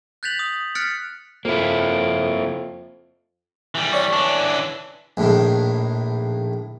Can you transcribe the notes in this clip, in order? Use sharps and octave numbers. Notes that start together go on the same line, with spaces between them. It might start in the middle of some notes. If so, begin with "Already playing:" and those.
F#6 G6 A6 B6 F7 F#7
D#6
F6 F#6 A6 B6 C#7 D7
F2 A#3 E4
E3 G3
C#5 D5 C#6
E3 D4
A#1 A2 D#3